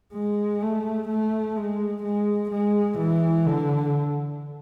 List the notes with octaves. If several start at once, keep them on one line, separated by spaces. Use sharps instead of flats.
G#3
A3
A3
G#3
G#3
G#3
E3
D3